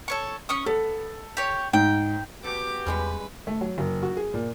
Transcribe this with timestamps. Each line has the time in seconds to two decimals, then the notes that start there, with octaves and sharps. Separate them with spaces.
0.08 A4 C#5 C#6
0.49 C#4 C#6 D#6
0.66 B3 A4
1.37 G4 C#5
1.73 G#2 G5
2.44 B3 F#4 G4 A4 D6
2.86 E2 G3 G#3 C#4 B4
3.47 A3
3.61 F#3
3.78 F#1
4.03 F#4
4.17 G#4
4.34 A#2